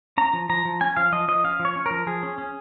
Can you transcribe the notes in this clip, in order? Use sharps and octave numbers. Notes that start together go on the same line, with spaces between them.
C#4 A#5
F3
F3 A#5
F3
C#4 G#5
F3 F5
F3 D#5
F3 D#5
C#4 F5
F3
C#5
C#4
F3 A#4
F3 G#4
C#4
C#4